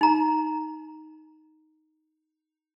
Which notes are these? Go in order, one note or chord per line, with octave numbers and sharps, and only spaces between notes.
D#4 A#5